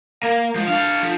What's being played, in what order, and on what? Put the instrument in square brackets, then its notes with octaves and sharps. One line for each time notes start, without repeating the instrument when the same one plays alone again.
[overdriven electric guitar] A#3 [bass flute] F5
[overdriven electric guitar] F3 [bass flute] G#3
[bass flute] D4 [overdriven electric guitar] A4 F5
[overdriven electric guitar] F3